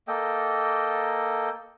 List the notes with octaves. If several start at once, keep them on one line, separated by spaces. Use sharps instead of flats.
A#3 A4 D#5 G5